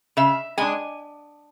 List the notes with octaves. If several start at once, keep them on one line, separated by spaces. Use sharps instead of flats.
C#3 E5
G#3 D4 G#5